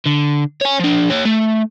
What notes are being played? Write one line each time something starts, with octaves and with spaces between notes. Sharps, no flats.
D3
C#5 G#5
F3 D4
G4 C#5
A3